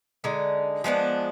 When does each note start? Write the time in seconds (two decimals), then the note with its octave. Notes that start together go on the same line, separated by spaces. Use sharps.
0.24 D3 G#3 D#4
0.84 F3 G#3 B3 D4